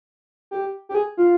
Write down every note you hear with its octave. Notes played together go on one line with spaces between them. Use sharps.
G4
G4
G#4
F4